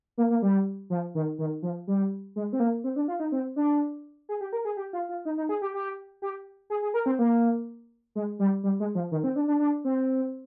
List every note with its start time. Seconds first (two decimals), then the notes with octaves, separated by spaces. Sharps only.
0.18 A#3
0.30 A#3
0.42 G3
0.90 F3
1.15 D#3
1.39 D#3
1.62 F3
1.87 G3
2.36 G#3
2.53 C4
2.60 A#3
2.84 C4
2.96 D4
3.08 F4
3.20 D#4
3.32 C4
3.56 D4
4.29 G#4
4.41 G4
4.53 A#4
4.65 G#4
4.77 G4
4.93 F4
5.09 F4
5.25 D#4
5.37 D#4
5.49 G#4
5.62 G4
5.74 G4
6.22 G4
6.70 G#4
6.82 G#4
6.94 A#4
7.06 C4
7.19 A#3
8.15 G#3
8.39 G3
8.64 G3
8.80 G#3
8.95 F3
9.12 D#3
9.24 C4
9.36 D4
9.48 D4
9.59 D4
9.85 C4